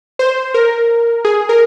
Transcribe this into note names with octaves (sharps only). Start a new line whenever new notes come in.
C5
A#4
G#4
A#4